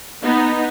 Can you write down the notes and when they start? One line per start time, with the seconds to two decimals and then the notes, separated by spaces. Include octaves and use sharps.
0.21 B3 D#4